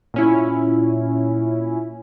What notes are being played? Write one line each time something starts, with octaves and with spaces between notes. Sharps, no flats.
A#2 C#4 E4